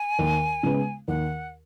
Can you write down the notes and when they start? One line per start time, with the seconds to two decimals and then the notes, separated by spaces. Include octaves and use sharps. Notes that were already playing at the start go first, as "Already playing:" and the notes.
Already playing: G#5
0.19 D#2
0.63 C#3 G#3 B3
1.08 D#2 F#5